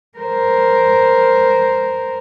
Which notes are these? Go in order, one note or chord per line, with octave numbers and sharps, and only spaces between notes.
A#4 C5